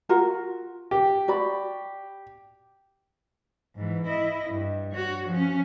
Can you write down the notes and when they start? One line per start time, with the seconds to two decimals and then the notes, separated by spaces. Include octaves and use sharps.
0.09 F4 F#4 A#4
0.91 G4
1.28 F#4 D5 B5
3.75 G#2 E3
4.06 E4 D#5
4.49 G2
4.92 F#4 C#5
5.28 F3 C#4